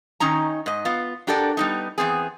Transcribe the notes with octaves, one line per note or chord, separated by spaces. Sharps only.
D#3 C#4 D#4 A#5
G#2 D#5
B3 F4
D4 F#4 G4 A4 A#4 D5
G3 B3 D#4
E2 B3 C4 G#4